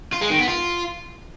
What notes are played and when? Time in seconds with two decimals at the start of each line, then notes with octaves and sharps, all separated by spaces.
0.13 F4
0.22 G#3
0.30 D#3
0.39 B3
0.48 F4